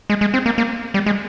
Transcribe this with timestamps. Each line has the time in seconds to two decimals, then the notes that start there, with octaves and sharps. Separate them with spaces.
0.10 G#3
0.21 G#3
0.34 C4
0.46 A#3
0.58 A#3
0.94 G3
1.06 G#3